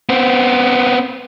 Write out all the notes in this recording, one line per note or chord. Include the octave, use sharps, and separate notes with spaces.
B3 C4